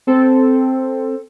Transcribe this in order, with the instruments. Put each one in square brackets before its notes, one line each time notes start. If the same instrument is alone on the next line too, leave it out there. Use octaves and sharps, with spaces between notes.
[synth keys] C4 A4